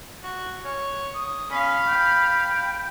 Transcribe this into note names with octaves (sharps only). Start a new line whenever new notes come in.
F#4
C#5
D#6
C#4 F5 B5
G5